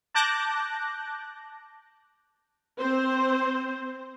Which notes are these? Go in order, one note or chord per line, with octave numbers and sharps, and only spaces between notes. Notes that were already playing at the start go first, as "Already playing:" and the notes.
A5 D6 F#6 G6 A#6
C4 C5